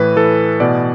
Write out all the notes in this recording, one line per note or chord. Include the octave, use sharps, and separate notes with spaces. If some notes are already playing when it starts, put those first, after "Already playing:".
Already playing: A2 E3 B4
E3 A4
B2 D5